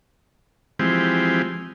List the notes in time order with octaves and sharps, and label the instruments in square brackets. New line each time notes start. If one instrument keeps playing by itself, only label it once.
[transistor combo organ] E3 F3 G#3 C4 G4